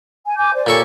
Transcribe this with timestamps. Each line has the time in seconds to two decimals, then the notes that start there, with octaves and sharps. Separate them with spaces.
0.24 G#5
0.36 G#5 D6 G6
0.53 C5 D5
0.66 A#2 G4 A4 C#5 C#6